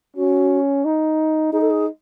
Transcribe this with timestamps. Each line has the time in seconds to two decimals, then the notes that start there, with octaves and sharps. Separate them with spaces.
0.16 C#4 F#4
0.85 D#4
1.52 D#4 G#4
1.61 A4
1.70 G#4